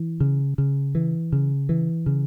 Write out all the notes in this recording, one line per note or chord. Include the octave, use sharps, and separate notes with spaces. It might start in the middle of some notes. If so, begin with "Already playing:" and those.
Already playing: E3
C#3
C#3
E3
C#3
E3
C#3